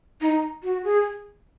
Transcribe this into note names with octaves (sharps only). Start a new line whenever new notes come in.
D#4
F#4
G#4